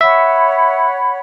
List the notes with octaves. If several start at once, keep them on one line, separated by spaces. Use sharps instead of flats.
C#5 E5 F#5 B5